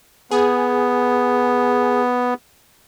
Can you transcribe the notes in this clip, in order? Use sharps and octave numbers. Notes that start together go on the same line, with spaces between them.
B3 G#4